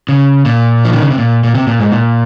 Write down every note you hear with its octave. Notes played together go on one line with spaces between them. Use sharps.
C#3
A#2
F3
D#3
C#3
C3
A#2
A#2
C3
A#2
G#2
A#2